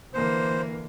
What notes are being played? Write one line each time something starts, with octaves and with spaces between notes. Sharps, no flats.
D3 E3 A#3 C5